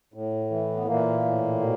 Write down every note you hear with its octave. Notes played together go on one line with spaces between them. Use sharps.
A2
E3
B3
A#2 E3 A#3
A2
B2